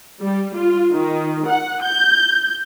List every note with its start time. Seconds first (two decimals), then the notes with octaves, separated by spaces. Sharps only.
0.21 G3
0.57 F4
0.94 D#3
1.48 F#5
1.84 G6